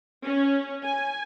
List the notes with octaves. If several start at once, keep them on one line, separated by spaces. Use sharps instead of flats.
C#4
G#5